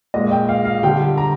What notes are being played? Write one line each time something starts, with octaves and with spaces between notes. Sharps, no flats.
A#2 G#3 D#5
G5
F5
F5
D3 G3 G5
A#5